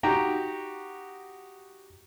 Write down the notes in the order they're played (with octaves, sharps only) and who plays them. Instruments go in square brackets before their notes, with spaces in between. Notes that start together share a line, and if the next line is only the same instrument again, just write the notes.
[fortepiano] D#4 F#4 G4 G5 A#5